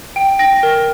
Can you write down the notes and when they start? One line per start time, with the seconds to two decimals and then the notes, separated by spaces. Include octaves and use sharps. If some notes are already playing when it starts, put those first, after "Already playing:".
0.16 G5
0.39 G5 A#6
0.63 A#4